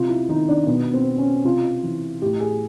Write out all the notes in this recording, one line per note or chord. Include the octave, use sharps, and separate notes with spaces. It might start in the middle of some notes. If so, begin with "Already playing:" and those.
Already playing: C3 F4
E4
D#3 D#4
D4
B2 B3
C4
C#4
C3 F4
E3
A2 G4
G#4